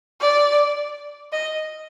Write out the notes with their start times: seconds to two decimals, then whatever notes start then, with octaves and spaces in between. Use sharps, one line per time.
0.21 D5
1.32 D#5